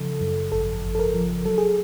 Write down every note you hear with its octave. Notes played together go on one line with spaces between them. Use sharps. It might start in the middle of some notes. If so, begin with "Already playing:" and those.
Already playing: C#3 F3 A4
F#2
G#1 A4
G#1
A4
A#4
F3
F#3 A4
G#4